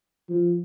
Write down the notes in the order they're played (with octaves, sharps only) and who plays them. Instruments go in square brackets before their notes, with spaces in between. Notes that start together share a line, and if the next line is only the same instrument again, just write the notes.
[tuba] F3